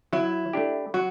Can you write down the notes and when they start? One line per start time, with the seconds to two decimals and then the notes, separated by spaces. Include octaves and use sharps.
0.13 F#3 E4
0.53 A3 D4 G4
0.94 F#3 F#4